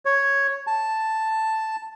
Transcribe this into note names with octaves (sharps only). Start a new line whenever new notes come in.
C#5
A5